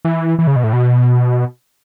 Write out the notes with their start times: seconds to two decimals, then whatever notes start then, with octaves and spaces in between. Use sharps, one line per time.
0.05 E3
0.39 E3
0.47 C#3
0.56 B2
0.64 A2
0.73 B2